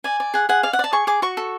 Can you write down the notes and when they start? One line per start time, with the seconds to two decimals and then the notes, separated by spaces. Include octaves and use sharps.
0.04 D5 G#5
0.20 D5
0.34 G#4 F#5
0.49 G#4 F#5
0.63 D5 F5
0.73 F#5
0.79 D5 A5
0.93 G#4 C#6
1.07 G#4 D6
1.22 F#4 C#6
1.37 A4